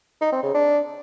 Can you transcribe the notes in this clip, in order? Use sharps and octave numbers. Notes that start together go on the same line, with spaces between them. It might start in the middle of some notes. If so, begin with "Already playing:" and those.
D#4
C4
C#3
D4